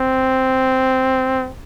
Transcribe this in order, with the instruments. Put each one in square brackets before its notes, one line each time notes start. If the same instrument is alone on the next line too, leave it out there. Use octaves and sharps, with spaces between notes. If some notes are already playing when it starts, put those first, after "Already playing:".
Already playing: [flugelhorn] C4